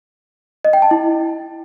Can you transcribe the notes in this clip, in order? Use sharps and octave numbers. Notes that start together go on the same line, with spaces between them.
D#5
G5
A5
E4